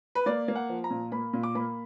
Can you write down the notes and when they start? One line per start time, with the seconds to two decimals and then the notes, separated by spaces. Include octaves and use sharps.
0.15 B4
0.26 A#3 D5
0.48 A#3
0.56 F#5
0.69 F3
0.84 A#5
0.90 A#2
1.12 A#3 B5
1.33 A#2
1.43 D6
1.55 A#3 B5